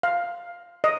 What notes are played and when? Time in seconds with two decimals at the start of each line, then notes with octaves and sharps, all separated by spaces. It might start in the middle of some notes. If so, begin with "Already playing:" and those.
0.03 F5
0.84 D#5